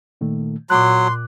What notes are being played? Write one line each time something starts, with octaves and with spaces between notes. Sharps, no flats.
A#2 D#3 A3
A#2 F#3 C6 D6 F#6